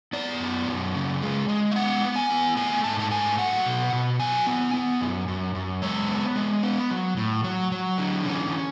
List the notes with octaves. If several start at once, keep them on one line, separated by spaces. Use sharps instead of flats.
B3 D5
F#2
F#2
C#3
G#3
G#3
E5
B3 F#5
B3
G#5
B3
A3 G#5
G#2 A5
A5
A3 G#5
F#3 F#5
B2
B2
F#3 G#5
B3
B3
F#2
F#2
F#2
G#3 C#5
B3
G#3
B3
F#3
A2
F#3
F#3
D3
E3 C#4